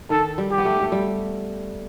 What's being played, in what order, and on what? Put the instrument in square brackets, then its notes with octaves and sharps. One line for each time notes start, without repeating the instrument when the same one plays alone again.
[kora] D#3 [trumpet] A4
[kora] G3
[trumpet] G4
[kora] B3
A3
A3
G3